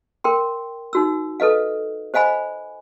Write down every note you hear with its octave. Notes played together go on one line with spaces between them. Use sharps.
A#4 G5 C6
D#4 F#4 E6
A4 B4 D#5 F5
C5 D#5 F5 G#5 B5